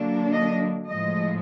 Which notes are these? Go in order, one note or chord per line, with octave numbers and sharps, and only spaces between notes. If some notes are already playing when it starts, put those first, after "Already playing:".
Already playing: D3 F#3 A#3 D4
D#5
A2 F3 G#3 D#5